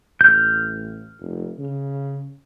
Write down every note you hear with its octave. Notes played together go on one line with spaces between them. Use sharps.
A1 F6 G6
F1
C#3